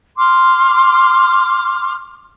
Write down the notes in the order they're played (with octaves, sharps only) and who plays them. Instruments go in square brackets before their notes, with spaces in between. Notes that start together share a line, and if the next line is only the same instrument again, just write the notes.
[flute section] C6 D6 F6